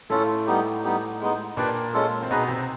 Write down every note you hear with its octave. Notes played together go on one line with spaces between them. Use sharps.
A2 A3 C#4 F4 A4
G3 B3 D#4 G4
G3 B3 D#4 G4
G#3 B3 D#4
A#2 A#3 D4 G4 B4 D5
G#3 C#4 F4 A4
C4
B2 B3 D#4 G#4 B4 D#5
C3 C4